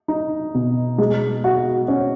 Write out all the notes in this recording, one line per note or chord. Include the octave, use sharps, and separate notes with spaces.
D#4
B2
G#3
F#4
C#4